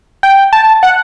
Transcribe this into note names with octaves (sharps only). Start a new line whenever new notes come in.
G5
A5
F#5